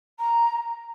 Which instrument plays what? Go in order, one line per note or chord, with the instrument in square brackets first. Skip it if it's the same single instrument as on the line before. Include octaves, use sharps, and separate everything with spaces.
[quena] A#5